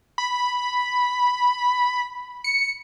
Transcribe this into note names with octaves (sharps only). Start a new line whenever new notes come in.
B5
C#7